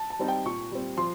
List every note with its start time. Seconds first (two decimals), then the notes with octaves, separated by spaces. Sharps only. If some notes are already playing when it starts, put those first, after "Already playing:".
Already playing: A5
0.10 A5
0.19 G3 C4 D#4
0.28 G5
0.46 A#2 C#6
0.72 G3 C4
0.97 F3 C6